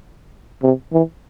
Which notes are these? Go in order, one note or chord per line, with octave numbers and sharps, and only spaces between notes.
C3
E3